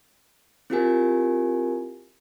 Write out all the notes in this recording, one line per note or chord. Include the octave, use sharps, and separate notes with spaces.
C4 E4 F4 G4 A#4 G#5